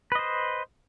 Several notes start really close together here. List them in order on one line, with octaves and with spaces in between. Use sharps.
B4 D#5 C5